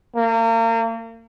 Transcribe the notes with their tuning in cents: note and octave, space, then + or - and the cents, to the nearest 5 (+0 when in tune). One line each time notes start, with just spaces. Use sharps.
A#3 -35